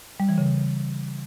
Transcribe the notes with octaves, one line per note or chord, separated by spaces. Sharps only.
G3
E3
C#3